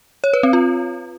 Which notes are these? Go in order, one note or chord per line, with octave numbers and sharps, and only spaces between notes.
C#5
B4
C4
F4